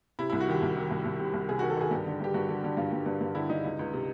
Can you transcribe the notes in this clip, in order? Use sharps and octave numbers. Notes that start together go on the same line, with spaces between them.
C3 E4
E4
C2
F#4
D#3 G4
C2
D#3
C2
C2
C3
C2
C3 G#4
F#4
D#3
A4
D#3 G#4
G2 G4
D3
G2 G4
G2 F#4
D3
D3
G2 F4
G2
G2
G2
D3 E4
G2 D#4
C#2
C#2
C3